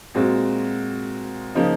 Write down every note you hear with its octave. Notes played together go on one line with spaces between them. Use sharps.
A#2 G#3 C4 F#4
C#3 F3 A#3 D#4